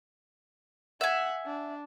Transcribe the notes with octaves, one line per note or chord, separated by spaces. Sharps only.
E5 F#5 G#5
D4